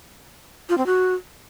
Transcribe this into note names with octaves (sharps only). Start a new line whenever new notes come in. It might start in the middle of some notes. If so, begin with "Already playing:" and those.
F4
C4
F#4